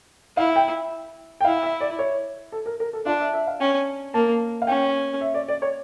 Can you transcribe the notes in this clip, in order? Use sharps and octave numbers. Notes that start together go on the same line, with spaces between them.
E4 F5
G5
G5
E4 F5
E5
D5
C#5
A4
A#4
A#4
A4
D4 F4
E5
E5
F5
C#4 G5
A#3 A5
F5
C#4 G5
E5
D5
D5
C#5